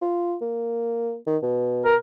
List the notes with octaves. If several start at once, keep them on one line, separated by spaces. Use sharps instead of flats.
F4
A#3
D#3
B2
A#4